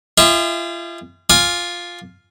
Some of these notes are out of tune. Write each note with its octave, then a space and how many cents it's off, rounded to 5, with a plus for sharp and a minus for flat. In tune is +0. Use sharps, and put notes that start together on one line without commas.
F4 -35 G#4 -45 E5 -30
F4 +0 G#5 +0 D6 +25